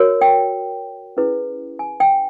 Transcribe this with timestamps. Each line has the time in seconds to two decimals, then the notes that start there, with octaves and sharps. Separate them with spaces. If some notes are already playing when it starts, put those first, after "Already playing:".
Already playing: F#4 A#4 C#5
0.21 G5
1.17 C#4 E4 G#4 B4
1.79 G#5
2.00 G5